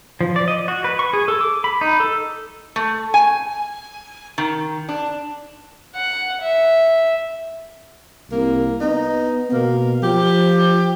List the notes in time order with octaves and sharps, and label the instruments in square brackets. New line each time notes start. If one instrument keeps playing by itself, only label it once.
[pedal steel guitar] F3
D5
D#5
F#4
B4
C#6
G#4
A4
D6
B5
D#4
A4
[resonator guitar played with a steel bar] A3
G#5
D#3
D4
[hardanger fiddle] F#5
E5
[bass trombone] C2 [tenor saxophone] A#3
[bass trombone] B3 [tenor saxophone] D#4
[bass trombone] B2 [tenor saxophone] A#3
[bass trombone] F3 [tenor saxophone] G4